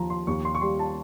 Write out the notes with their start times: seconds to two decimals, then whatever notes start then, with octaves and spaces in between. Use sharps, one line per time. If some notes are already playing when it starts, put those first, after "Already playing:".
Already playing: D#2 F3 A#5
0.10 C6
0.27 D#2 C#6
0.45 C6
0.55 C#6
0.61 G3 C6
0.79 A5